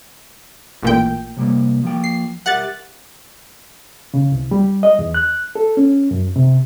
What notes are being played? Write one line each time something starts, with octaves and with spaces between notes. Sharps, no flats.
A1 A#2 G5
C3 G3 A#3
F3 A#3 G5
C7
G4 A#4 E5 F#5 F#6 A6
C#3
C2
G3
D#5
E2
F#6
A4
C#4
F#2
C3